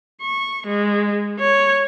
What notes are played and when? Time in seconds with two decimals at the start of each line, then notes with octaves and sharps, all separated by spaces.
0.22 C#6
0.67 G#3
1.40 C#5